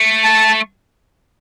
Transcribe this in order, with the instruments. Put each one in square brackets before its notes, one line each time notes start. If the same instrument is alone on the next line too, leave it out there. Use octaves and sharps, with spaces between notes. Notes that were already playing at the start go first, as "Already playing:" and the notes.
Already playing: [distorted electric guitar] A3
[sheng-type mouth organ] A5